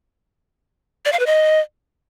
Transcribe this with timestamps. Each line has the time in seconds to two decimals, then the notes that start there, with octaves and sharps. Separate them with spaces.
1.05 D5
1.12 F5
1.19 B4
1.26 D#5